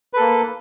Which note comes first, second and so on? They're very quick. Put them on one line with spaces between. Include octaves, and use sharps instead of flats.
B4 A4 A#3